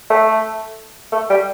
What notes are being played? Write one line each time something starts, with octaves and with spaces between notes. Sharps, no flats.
A3
A3
G3